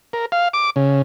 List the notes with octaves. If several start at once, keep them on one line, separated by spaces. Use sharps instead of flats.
A#4
F5
D6
C#3